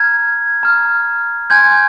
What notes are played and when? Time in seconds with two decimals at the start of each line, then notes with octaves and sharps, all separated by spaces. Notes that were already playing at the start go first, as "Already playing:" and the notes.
Already playing: A#5 F6 G#6
0.63 A#5 F6
1.50 G#5 C6 G6 G#6